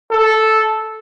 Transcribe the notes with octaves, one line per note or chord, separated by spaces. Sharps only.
A4